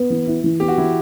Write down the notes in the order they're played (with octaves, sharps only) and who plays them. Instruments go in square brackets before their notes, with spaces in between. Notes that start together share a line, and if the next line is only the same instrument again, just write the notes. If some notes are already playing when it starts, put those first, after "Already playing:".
Already playing: [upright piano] B3
E3
E4
E3
[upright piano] B3 [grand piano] G4
[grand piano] F#4
[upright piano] E3 [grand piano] E4